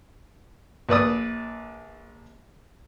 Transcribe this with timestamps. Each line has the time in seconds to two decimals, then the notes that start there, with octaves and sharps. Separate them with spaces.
0.89 A#1 B4 D5 D#6